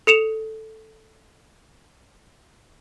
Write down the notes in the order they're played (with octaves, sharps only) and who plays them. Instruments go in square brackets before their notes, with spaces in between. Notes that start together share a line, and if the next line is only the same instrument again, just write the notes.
[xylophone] A4 C#7 E7 F7